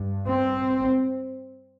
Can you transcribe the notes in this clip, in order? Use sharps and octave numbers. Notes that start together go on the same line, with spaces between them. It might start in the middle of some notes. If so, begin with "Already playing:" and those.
Already playing: G2
C4